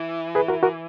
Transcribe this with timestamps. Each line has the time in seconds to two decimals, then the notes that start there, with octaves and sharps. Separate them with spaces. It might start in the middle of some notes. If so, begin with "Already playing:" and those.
Already playing: E3
0.35 G#4 B4
0.48 F#4 A#4
0.63 F#4 A#4